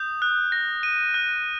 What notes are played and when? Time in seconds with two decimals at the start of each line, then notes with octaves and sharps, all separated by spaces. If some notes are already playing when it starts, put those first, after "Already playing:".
Already playing: D#6 G6
0.22 F#6
0.52 A#6
0.83 D#7
1.14 F#6